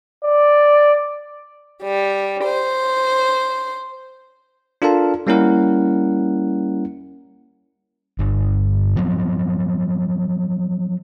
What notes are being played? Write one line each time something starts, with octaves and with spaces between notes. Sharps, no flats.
D5
G3
C5
D4 F4 A4 A#4 F5 A5
G3 A#3 C#4 E4 A#4 F#5
G1
F3 F#3 B3 C4